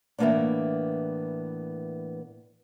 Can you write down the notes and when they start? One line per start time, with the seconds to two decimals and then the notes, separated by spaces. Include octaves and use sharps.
0.18 A2 E3 G#3 A#3 B3 D4